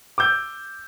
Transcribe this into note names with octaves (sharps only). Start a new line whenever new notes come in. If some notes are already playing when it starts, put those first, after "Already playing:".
D6 E6 G6